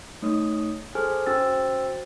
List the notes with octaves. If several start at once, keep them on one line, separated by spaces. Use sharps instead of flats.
A3 D#4 C#5 D#6
G#4 A4 C5 G#5 F6
C#4 F#4 C5 G5 E6 A6